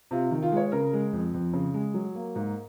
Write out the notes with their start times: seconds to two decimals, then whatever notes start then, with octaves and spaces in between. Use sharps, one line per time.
0.11 C3 F4
0.31 D#3
0.42 F4
0.52 G#3 C#5
0.72 C#3 A#4
0.93 G#3
1.13 F2
1.34 F2
1.54 C#3
1.74 G#3
1.94 F#3
2.15 A#3
2.35 G#2